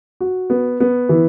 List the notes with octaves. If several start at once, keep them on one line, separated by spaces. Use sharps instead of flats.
F#4
B3
B3
E3